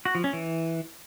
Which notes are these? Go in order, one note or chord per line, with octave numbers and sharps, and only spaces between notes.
F#4
F3
C#4
E3